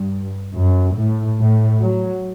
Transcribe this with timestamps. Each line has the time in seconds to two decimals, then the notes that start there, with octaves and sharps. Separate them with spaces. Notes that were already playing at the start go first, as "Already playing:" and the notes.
Already playing: G2
0.55 F#2
0.96 A2
1.38 A2
1.80 F#3